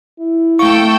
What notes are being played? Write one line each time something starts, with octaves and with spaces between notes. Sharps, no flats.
E4
A3 A4 F5 G5 C#6